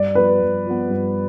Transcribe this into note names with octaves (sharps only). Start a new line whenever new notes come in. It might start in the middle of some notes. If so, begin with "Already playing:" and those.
Already playing: G2 D5
F3 B3 B4
G2
F3 B3
G2